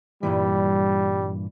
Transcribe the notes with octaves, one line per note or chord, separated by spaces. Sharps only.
G2 A#2 E3 G3